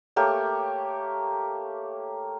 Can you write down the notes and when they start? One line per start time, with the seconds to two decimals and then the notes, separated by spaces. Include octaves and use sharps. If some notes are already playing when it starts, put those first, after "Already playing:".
0.16 A3 A#3 G4 C#5